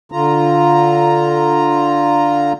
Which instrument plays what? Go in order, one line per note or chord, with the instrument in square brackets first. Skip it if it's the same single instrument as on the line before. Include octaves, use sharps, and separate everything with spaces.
[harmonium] D3 F4 A#5